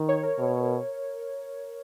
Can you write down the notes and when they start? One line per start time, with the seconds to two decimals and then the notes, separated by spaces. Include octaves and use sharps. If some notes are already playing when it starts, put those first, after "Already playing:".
Already playing: D#3
0.09 C#5
0.23 A#4
0.38 B2